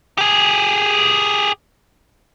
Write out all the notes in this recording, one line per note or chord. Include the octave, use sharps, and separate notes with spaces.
G4 G#4